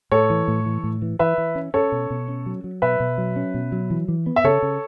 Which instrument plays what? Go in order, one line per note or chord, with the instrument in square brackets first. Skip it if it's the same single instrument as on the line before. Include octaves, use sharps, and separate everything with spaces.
[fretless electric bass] A2 [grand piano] A4 C#5
[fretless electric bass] E3
A2
E3
A2
E3
[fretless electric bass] E3 [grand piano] B4 E5
[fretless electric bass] E3
C#4
[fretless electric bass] C#4 [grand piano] A4 C#5
[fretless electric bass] B2
B2
C#4
F#3
F#3
[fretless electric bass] B2 [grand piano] B4 E5
[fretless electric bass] B2
F#3
C#4
B2
F#3
E3
E3
B3
[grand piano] E5
[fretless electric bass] C#3 [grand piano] A4 C#5
[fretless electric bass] C#3